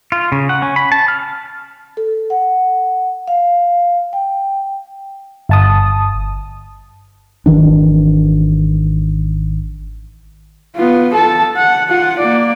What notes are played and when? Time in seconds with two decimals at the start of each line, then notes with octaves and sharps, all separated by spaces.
0.12 F4
0.32 C#3
0.49 F#5
0.62 C#4
0.76 B5
0.92 A5
1.08 F6
1.97 A4
2.30 F#5
3.28 F5
4.13 G5
5.49 G1 A5 D#6
7.46 G#1 D#3 E3 D4
10.76 B3 F4
11.14 A4 A5
11.56 F#5
11.88 F4 F#5
12.19 A#3 D5